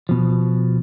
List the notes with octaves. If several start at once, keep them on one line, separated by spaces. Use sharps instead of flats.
B2 F3